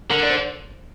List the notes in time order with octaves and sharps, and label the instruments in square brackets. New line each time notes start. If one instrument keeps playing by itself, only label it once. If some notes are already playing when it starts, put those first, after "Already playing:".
[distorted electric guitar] D3 [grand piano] A#4
[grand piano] D5
C5